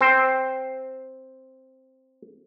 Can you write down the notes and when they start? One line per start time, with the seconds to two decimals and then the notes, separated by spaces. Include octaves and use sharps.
0.01 C4 C5